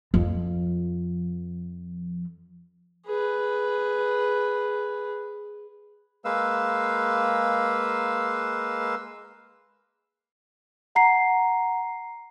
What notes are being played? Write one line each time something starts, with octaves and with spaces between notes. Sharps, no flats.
F2 F3
G#4 B4
G#3 A#3 B4 F5 E6
F#5 A#5 C7